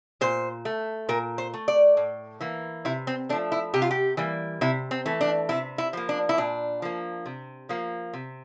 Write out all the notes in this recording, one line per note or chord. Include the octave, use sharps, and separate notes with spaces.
A#2 C5
A3
A#2 A#4
C5
A3
D5
A2
E3 A#3
C3 E4
C4
F3 A3 D4
E4
C3 G4
F4
G4
E3 G3 A#3
C3 E4
C4
E3 A3
D4
C3 E4
E4
F3 A#3
D4
E4
A#2 D4
F3 A#3
C3
F3 A#3
C3